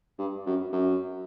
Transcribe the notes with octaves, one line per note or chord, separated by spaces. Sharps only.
G2
F#2
F#2